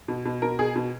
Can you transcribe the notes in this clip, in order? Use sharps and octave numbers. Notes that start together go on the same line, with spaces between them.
B2
B2
B2 A#4
B2 G#4
B2